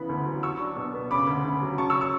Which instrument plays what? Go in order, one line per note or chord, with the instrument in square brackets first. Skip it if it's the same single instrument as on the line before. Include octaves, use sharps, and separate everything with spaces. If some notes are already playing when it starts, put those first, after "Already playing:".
Already playing: [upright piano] C#3 E3 B3 B5
D2
F#3
F#3 C#6 E6
D4
B2
B3
C#3 B5 D6
D2
D2
F#3
C#3 A5 C#6
C#6 E6
C#4
C#6 E6